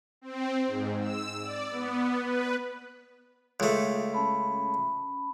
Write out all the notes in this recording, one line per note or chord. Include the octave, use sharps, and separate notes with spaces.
C4
G#2
E6
D5
B3
B4
C#2 A3
C#4 A5 B5